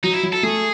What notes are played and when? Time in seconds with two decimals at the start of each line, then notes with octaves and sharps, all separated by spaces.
0.04 F#3 D#4
0.14 E4
0.23 F#3
0.33 A4
0.43 A3 G#4